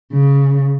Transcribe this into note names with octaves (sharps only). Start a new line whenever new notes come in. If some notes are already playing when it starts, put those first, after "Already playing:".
C#3